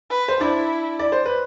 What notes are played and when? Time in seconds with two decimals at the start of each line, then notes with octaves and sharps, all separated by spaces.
0.10 B4
0.28 C5
0.40 D4 E4 D5
0.99 D5
1.12 C5
1.26 B4